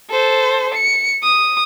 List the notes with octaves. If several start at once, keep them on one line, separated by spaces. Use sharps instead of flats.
A4 C5
C#7
D#6